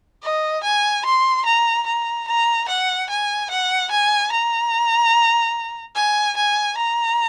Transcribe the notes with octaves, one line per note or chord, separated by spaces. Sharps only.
D#5
G#5
C6
A#5
A#5
A#5
F#5
G#5
F#5
G#5
A#5
G#5
G#5
A#5